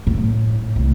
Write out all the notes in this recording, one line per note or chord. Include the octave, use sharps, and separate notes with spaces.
A2
C2 A3